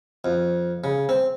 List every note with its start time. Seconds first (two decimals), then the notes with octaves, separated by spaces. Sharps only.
0.25 F2
0.84 C#3
1.09 C4